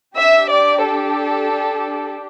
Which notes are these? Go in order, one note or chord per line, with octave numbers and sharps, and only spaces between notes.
D4 G4 E5
D5
A4